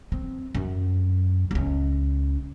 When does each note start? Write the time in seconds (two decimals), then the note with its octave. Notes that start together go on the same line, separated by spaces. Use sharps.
0.12 C4
0.55 F#2
1.51 C#2 C#4